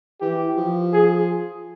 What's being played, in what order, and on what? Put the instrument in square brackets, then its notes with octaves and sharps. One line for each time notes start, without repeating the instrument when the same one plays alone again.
[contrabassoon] E3 [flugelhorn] G4
[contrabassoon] F3
[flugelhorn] G#4